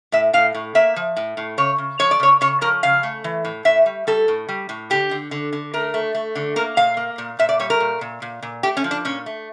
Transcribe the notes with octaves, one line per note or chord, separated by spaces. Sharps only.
A2 E5
A2 F5
A2
A#3 E5
F3
A2
A2
C#3 C#5
C#3
F3 C#5
D5
C#3 C#5
C#3 C#5
F3 A#4
C#3 F5
A3
E3
A2
A2 E5
G3
G3 A4
A2
G3
A2
D3 G4
D3
D3
D3
A3 A#4
A3
A3
D3
A#3 A#4
A#2 F5
A#3
A#2
A#2 E5
D5
G3 C#5
A#4
A#2
A#2
A#2
A#2
A3 G4
C#4
F3
D4
A#2 C#4
A3